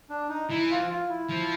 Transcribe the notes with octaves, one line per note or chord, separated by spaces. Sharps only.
D4
D#4
E3 E4
F4
F4
E4
F3